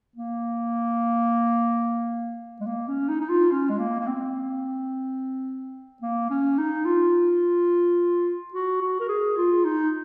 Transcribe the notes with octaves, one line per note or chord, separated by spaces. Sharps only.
A#3
G#3
A#3
C#4
D#4
D#4
F4
C#4
G#3
A#3
A#3
C4
A#3
C#4
D#4
F4
F#4
F#4
A#4
G#4
F4
D#4